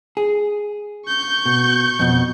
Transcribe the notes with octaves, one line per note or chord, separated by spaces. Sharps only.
G#4
C#6 G6
B2
F2 B2